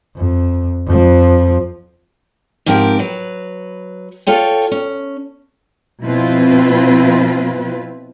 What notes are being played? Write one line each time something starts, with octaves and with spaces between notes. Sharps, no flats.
F2
F2 F3
G#2 F3 C4 G4 G#4 A#4
F#3 B4
F4 A4 C#5 G5
C#4
B2 F3 C4 E4 F4 B4